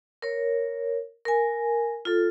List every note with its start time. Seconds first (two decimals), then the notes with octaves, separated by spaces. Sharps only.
0.22 A#4 C#5
1.25 A#4 G#5
2.05 F4 A4